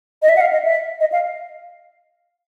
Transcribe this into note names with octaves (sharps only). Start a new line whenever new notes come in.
D#5
E5
F#5
F5
D#5
E5
D#5
F5